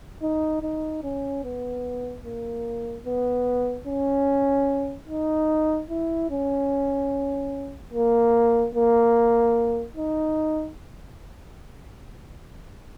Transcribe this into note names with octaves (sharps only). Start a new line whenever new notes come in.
D#4
D#4
C#4
B3
A#3
B3
C#4
D#4
E4
C#4
A#3
A#3
D#4